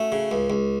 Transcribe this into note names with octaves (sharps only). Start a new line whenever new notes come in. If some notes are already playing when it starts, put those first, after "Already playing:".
Already playing: A3 C#4 F#4
C#3
C#2
C#2